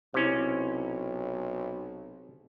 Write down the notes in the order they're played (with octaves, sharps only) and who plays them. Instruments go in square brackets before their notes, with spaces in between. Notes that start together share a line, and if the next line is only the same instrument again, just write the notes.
[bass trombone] B1 [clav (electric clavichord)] C3 C#4 [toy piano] E4 C5